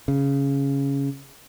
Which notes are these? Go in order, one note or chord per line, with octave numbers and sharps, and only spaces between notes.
C#3